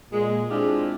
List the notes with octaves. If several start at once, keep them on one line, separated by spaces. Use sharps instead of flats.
A#2 G#3
G#3 C4 D4 E4 F4 G4